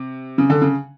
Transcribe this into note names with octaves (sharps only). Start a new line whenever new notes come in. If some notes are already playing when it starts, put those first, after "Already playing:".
Already playing: C3
C#3
D3
C#3